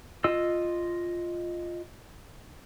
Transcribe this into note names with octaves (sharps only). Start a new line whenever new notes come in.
F4 D#5 E6